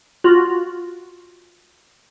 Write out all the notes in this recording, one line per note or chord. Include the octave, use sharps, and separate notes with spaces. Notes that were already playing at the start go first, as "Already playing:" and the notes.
F4 F#4